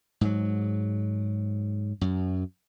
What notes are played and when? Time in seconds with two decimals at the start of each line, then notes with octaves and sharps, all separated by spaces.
0.21 G#2 F#3
2.01 F#2